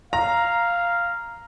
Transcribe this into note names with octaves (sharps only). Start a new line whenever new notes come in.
F5 A#5